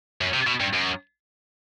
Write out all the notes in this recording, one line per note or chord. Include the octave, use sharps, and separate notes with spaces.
F#2
C3
B2
G2
F#2